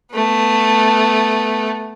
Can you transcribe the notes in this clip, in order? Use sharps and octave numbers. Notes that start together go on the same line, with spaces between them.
A3 B3